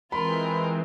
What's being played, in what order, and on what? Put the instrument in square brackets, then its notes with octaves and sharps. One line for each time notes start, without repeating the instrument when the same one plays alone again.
[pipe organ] E3 G#3 C4 [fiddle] F4 A#4 [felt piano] B5 [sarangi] C6